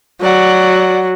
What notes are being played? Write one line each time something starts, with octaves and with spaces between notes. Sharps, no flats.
F#3 D5 F#5